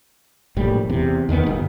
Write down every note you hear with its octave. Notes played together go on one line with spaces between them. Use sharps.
A#1 A2 G3
E2 C3
E2 D#3 G#3 B3
G1